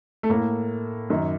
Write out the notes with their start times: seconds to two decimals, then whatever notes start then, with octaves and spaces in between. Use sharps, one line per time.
0.23 A3
0.29 A2 A#3
1.10 F#2 D#3